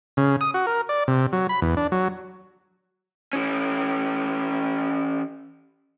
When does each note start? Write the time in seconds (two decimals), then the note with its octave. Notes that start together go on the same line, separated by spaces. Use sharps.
0.17 C#3
0.41 D#6
0.54 F#4
0.67 A#4
0.89 D5
1.08 C3
1.33 F#3
1.49 B5
1.62 E2
1.77 D4
1.92 F#3
3.33 E3 C#4